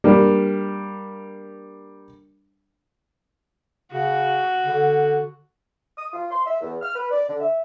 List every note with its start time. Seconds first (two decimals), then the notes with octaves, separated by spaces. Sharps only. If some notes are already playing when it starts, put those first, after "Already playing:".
0.04 G3 A#3 D4
3.93 C#3 F#4
4.66 D3
5.97 D#6
6.12 F4
6.31 C6
6.46 E5
6.61 E2
6.82 F6
6.95 B4
7.11 D5
7.28 D3
7.40 E5